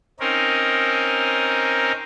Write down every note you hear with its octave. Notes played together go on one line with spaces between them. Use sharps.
C4 C#4 D#4 A#4